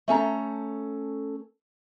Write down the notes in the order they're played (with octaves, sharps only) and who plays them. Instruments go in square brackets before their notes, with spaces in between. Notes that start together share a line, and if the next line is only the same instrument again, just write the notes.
[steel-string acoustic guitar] A3 C#4 A4 A#5